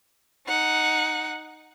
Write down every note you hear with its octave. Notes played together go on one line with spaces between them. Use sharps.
D#4 F#5